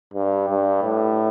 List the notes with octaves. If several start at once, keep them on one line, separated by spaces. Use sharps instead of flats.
G2
G2
A2